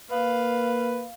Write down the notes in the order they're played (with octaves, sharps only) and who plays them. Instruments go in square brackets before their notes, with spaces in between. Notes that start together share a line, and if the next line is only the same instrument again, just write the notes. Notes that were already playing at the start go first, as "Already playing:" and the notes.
[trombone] A#3 [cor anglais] B4 [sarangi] F5